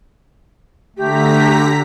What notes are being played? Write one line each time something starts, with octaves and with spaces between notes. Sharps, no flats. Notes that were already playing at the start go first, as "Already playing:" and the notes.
D3 A3 G4 A#5 B6